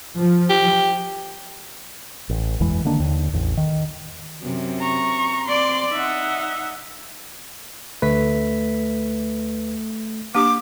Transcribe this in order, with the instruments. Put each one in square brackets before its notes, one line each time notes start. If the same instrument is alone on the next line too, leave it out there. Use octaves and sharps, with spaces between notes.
[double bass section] F3
[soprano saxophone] G4
[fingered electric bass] A1
F#1 E2 E3 G#3
D3 D#3 A#3 D4
D#2 D3
A1 E2
D#3
[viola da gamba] F#2 C3
[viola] A#5 C#6
[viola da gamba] C4 D5 [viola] C6 D6
[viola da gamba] D#4 [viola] E5 F#5
[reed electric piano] D2 B4 [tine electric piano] A3 B6
[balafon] A#3 D4 G4 [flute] D6